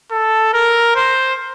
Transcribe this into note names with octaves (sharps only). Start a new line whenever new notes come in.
A4
A#4
C5